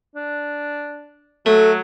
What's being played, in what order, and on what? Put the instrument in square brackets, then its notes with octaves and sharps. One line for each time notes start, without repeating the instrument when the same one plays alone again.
[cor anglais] D4
[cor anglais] F#3 [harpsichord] A3 [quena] A4